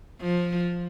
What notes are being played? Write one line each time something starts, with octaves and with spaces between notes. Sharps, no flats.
F3